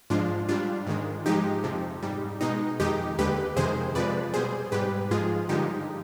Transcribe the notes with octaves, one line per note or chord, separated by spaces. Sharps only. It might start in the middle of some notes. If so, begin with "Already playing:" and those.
G#2 F3 G#3 D4 F4
G#2 G3 D4 F4
G#2 D#3 G#3
G#2 F3 G#3 D#4 G4
F2 C3 F3
G#2 G3
B2 G#3 D#4
F2 D#3 G#3 D#4 G4
D#2 D3 G#3 G4 B4
F2 C3 D#3 G#3 G#4 C5
F2 C3 F3 G#3 B4 D5
B2 G3 G#4 C5
G#2 G3 G4 B4
G#2 F3 G#3 F4 G#4
G2 D3 F3 G#3 D#4 G4